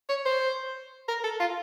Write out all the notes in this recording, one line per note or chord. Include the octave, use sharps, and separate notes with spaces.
C#5
C5
A#4
A4
F4